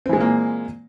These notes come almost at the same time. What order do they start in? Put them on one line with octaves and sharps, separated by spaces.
C4 E3 G#3 A#2 A#3